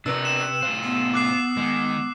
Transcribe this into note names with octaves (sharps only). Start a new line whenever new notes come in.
C3 D4 A#4 B4 E6
E7
A2 C3 F4 C5
B3
D6 F#6 C7
D#3 G#3